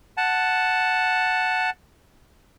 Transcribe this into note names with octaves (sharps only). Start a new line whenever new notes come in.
F#5 A5